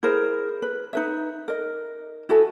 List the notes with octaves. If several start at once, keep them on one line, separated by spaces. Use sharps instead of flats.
E4 G#4 A#4 C5
B4
D#4 B4 E5
A#4 D#5
E4 F#4 A4 G#5